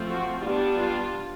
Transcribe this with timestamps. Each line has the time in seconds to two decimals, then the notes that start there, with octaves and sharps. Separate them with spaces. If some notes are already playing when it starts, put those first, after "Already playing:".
Already playing: F3 A3 C4
0.10 F#4
0.41 G3 B3 D4 F4
0.74 F4